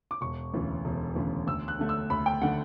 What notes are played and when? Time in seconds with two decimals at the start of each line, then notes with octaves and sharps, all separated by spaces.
0.11 D6
0.21 E1 C#6
0.53 D2 C#3 E3
0.85 E1
1.15 D2 C#3 E3
1.47 D2 E6
1.68 F#6
1.79 D3 A3
1.89 E6
2.10 D2 B5
2.26 G5
2.41 D3 A3 F#5